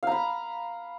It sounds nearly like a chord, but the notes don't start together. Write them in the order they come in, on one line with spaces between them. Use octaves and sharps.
F5 A#5 B5